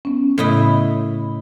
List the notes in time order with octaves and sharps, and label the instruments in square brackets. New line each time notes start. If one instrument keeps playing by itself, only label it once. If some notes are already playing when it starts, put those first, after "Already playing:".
[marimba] B3 C#4
[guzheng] A2 E4 D#5 [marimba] C#3